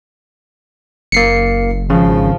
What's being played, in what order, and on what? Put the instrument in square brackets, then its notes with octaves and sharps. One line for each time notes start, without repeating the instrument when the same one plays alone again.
[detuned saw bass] F#1 [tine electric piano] A#3 C7 C#7
[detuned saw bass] G#1 [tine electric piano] C#3 [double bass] F3